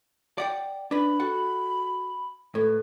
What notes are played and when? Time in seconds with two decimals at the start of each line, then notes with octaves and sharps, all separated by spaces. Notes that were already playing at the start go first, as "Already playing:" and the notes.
0.38 D5 F#5 G5
0.91 D4 B4 B5
1.20 F#4 A4 F#5
2.55 A2 A4 B4